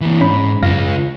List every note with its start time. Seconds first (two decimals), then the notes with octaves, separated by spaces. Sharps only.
0.01 E3 A#3
0.21 G#2 C#4 B5
0.62 C#2 F#2 F4 F5 A#6